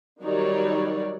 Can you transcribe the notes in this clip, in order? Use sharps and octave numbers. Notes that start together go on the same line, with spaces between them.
D#3 F#3 G3 D#4 C#5 D5